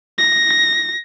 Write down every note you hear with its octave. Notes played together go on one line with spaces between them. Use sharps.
A#6